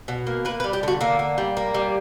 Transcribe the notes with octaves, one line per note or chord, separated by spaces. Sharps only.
B2
A#3
A#3 B4
B4
G3
G4
D3 F#4
D3 A#3
A#3
G3
A#3
G3